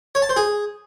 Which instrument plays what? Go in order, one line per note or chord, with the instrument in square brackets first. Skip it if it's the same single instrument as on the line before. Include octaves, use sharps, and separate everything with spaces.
[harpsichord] C#5
A5
C5
G#4